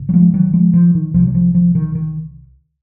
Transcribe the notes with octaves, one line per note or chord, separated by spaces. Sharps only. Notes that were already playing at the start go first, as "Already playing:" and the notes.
Already playing: G#1 C#3
F#3
F3 G#3
D#3 F#3
F3 G#3
F3
D#3
C2 C3 F3
F#3
F3
F3
D#3
D#3